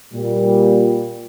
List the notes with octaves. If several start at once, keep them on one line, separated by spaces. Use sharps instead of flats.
A#2 G3